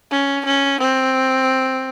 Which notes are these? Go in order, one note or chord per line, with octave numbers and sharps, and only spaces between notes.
C#4
C#4
C4